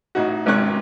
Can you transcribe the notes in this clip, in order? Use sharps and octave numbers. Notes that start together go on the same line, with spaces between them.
A1 D#4 F#4
G#1 C#2 C3 C#4 C#6 F#6